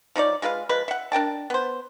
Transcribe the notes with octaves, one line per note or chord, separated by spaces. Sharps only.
F3 D#4 C#5 D5
G#3 F4 B4 F5
F3 G#3 B4
E5 F#5
D4 A#4 G5 A5
B3 C5